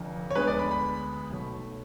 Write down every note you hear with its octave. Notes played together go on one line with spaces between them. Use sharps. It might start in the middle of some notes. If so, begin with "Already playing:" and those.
Already playing: F1 F2 D3
C#5
D2 D3 G#3 B3 B4
D5
B5
B5
B1 B2 F#3 A3